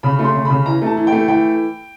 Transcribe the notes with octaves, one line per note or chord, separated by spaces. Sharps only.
C#3 B5
A3
C6
C#3
C#3 B5
E3 A#5
A3 A5
E3
G5
A3
E3 G5